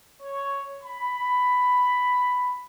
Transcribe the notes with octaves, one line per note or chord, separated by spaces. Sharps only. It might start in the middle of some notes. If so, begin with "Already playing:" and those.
C#5
B5